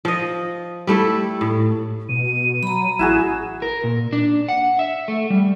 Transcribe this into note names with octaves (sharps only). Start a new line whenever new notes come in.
F3 D#5
G3 A3 E4 A4
A2
B2 D#7
F#3 A#5 B5
A1 E4 F#4 G#4 E7
A#4
A#2
D4
F#5
E5
A3
G3